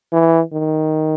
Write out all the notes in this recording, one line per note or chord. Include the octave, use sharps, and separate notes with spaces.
E3
D#3